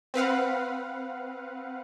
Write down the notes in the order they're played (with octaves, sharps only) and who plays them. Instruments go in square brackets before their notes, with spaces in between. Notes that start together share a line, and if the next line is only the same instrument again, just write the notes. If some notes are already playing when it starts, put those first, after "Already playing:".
[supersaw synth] C4 B4 F5 F#5